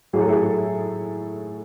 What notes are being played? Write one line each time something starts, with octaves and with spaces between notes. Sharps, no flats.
A2 F#3 G#4
A4
E4 G#4